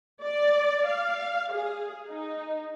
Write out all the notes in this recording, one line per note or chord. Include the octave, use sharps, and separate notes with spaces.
D5
F5
G#4
D#4